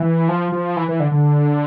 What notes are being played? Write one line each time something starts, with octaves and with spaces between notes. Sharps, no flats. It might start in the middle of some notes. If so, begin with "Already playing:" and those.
Already playing: E3
F3
F3
E3
E3
D3
D3